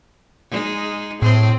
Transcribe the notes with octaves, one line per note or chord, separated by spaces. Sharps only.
G#3 D#4
A2 C4 G#4 C5